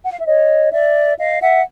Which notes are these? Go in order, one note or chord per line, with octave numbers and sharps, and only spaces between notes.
F#5
F5
E5
C#5 D#5
D5 E5
D#5 F5
E5 F#5